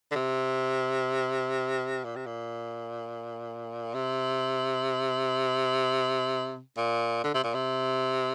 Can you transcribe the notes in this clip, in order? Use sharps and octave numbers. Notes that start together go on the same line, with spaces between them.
D3
C3
A#2
C3
A#2
C3
A#2
D3
C3
A#2
C3